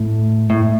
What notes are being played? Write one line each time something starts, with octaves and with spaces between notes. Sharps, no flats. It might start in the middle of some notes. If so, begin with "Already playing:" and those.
Already playing: A2
A2